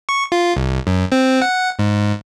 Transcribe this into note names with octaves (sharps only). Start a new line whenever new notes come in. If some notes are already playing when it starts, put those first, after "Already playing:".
C#6
F4
C2
F#2
C4
F#5
G#2